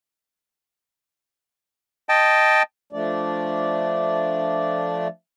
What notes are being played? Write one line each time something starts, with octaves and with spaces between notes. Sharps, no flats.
D#5 G5 A5
F3 A3 D4 D5